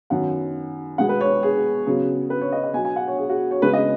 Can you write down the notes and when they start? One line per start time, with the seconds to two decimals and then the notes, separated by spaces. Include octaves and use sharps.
0.10 F#2 D#3 B3 F#5
0.98 B2 G#3 B3 F#5
1.09 B4
1.21 C#5
1.43 G#4
1.86 C#3 F#3 B3
2.30 B4
2.41 C#5
2.52 D#5
2.63 D#5
2.74 B2 F#3 B3 G#5
2.85 G#5
2.96 F#5
3.07 C#5
3.18 G#4
3.29 F#4
3.51 C#5
3.62 C#3 G#3 B3 B4
3.73 D#5